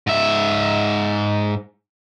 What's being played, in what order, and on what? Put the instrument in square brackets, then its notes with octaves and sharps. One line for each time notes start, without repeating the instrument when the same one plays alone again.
[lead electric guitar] G#2 E5